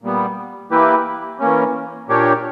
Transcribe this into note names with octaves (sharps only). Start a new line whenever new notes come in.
A#2 G3 B3
E3 A#3 E4 G4 B4
E3 A#3 C#4
A#2 A#3 D4 G4 C#5